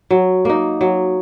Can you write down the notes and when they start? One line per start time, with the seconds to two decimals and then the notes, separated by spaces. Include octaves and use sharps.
0.11 F#3
0.45 A#3 D#4
0.81 F#3